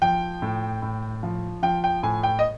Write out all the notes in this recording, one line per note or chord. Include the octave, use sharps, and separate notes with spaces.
F3 G5
A2
A2
F3
F3 G5
G5
A2 G#5
G5
D#5